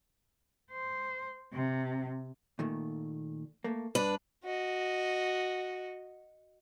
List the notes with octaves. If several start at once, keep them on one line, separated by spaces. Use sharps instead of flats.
C5
C3
A#2 D#3 A3
A3 A#3
G2 D4 B4
F#4 D#5